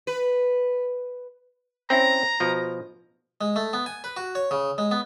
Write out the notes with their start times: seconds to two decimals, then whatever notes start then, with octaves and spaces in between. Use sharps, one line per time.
0.07 B4
1.90 C4 C#4 E4 A#5
2.40 B2 F3
3.41 G#3
3.56 A3
3.73 B3
3.86 G#5
4.04 B4
4.17 F#4
4.35 C#5
4.51 C#3
4.78 G#3
4.91 B3